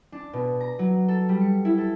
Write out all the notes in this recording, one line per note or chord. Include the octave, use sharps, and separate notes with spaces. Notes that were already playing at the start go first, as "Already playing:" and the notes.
D4
B2
A#5
F#3
A4
G3
C#7
E4
A4